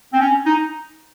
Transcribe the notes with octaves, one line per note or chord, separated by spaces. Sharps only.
C4
C#4
D#4